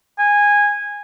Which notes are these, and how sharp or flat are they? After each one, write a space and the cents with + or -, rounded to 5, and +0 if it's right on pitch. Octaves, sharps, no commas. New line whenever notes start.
G#5 -15